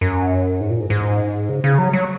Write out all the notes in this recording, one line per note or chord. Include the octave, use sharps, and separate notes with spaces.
F#2
G#2
A#2
G#2
G#2
C#3
C#3
F#3
F#3